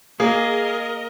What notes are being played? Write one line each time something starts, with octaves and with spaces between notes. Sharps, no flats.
A#3 G#4 A#4 D#5